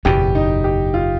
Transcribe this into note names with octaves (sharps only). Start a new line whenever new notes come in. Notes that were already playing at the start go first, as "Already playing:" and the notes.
F#1 E2 B2 G4
D#4
G4
F4